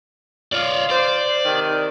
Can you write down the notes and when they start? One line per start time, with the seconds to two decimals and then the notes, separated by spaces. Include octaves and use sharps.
0.53 F4 C#5 D5
0.90 C5 D5
1.46 C3 D#3